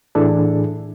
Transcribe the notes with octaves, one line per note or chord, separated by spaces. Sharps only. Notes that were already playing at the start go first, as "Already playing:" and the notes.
A2 E3 D4 E4 G#4 A4